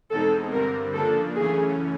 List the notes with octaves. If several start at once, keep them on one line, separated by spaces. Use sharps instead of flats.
E2 B2 G#3 C4 D#4 A4
G2 D3 G3 C4 A#4
C#3 F3 A#3 D4 A4
F#2 C#3 E3 A3 C#4 G#4